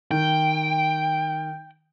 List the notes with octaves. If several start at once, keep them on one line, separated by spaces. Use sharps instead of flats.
D#3 G5